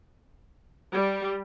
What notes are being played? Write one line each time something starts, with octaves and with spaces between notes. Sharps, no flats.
G3